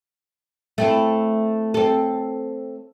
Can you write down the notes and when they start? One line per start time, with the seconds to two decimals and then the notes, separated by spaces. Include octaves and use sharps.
0.78 A3 C4 E4
1.74 C4 A4